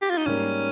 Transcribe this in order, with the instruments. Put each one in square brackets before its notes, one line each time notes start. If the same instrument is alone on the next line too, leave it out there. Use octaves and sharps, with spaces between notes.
[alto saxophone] G4
F4
D#4
[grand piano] G#2 G3 A#3 [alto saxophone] C#4